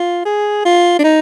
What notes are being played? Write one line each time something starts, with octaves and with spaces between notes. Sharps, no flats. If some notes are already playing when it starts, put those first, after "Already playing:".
Already playing: F4
G#4
F4
D4
D#4